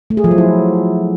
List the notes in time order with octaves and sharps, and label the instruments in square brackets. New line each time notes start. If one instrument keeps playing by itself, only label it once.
[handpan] A3
G#4
F3
F#3
E4